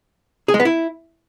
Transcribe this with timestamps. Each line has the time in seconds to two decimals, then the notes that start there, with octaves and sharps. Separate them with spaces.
0.48 G#4
0.54 G#3
0.60 B3
0.65 E4